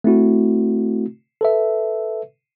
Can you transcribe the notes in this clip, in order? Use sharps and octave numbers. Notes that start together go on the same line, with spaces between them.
A3 C4 E4 F#4
A4 B4 E5